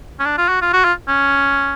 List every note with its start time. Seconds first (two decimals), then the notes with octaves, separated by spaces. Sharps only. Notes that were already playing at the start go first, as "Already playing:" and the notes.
0.20 C#4
0.25 D4
0.38 F4
0.49 F#4
0.62 F4
0.73 F#4
0.85 F4
1.08 C#4